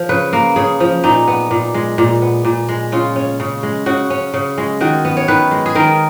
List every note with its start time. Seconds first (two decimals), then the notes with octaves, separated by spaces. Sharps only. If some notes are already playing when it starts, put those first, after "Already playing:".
Already playing: F3
0.09 C#3 B4
0.33 A#3
0.56 C#3 G#4
0.80 F3
1.04 A#2 D#4
1.28 B3
1.51 A#2
1.74 G#3
1.98 A#2
2.22 B3
2.45 A#2
2.68 G#3
2.92 C#3 F4
3.16 C#4
3.40 C#3
3.63 G#3
3.86 C#3 F#4
4.10 C#4
4.34 C#3
4.58 G#3
4.81 D#3 F#4
5.05 B3
5.17 C#5
5.28 D#3 B4
5.51 G#3
5.66 G#4
5.75 D#3 A#4